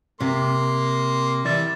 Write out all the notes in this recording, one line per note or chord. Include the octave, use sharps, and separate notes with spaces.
C3 A#3 C6
E3 G3 D5 E5 A6